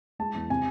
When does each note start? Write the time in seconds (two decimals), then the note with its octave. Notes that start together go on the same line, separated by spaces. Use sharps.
0.19 G#3 A5
0.35 E2
0.50 C3 G#5